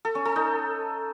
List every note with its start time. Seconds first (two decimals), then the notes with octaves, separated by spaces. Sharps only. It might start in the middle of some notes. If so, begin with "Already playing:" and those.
0.05 A4
0.15 C#4
0.25 A4
0.36 D#4